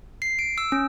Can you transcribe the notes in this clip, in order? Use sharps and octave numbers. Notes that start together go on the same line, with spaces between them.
C7
D7
E6
C#4